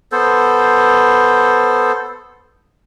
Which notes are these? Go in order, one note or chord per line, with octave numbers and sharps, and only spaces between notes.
B3 A4 C5